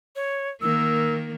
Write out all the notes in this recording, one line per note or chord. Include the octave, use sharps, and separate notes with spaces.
C#5
D#3 A#3 E6